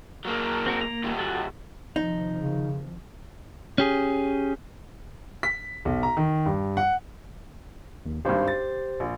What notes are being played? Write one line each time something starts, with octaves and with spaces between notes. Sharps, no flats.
F#3 A#3
C4 F#4 A#4
A#3 A#5
D#3 G3
F#4 A4
C3 D#3 F3 D#4
C#3
C#4 G4 G#4
B6
B1
A#5
D#3
G2
F#5
D#2
G#1 G2 G4 C5
A6
A#1